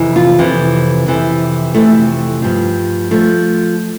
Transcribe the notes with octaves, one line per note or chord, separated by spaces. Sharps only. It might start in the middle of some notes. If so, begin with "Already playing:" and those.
Already playing: F2 C3 E3
F4
F2 C3 E3
F2 C3 E3
F2 C3 E3 A3
G2 F3
F3 A3